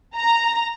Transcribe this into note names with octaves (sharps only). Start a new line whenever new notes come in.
A#5